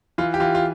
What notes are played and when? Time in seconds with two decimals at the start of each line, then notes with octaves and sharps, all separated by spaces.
0.18 E3 F4
0.34 G4
0.40 E3 F4
0.55 F4